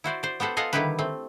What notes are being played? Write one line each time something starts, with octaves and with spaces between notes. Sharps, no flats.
E4 F#4 C5 D5
C5 D5
B3 G4 A4 C5 F#5
F4 A4 D#5 F5 F#5 G#5
D3 D#3 G3 E4 G4 B4
A3 C4